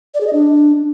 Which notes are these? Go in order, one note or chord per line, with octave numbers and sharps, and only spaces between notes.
D5
G#4
D#5
D4